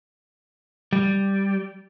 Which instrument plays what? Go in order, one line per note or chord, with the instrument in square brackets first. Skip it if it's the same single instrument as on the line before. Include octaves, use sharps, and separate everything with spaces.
[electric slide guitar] G3